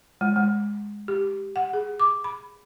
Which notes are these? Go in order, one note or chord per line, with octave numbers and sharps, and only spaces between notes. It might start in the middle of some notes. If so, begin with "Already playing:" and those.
G#3
G#3
G4
F#5
G#4
D6
B5